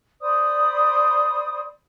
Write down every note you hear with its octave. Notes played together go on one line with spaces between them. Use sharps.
C5 D5 B5 D#6